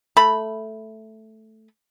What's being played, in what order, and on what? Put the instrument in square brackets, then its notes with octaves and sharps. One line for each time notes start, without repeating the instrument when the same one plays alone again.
[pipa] A3 B5